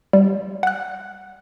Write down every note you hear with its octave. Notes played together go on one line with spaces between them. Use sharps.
G3
F#5 F#6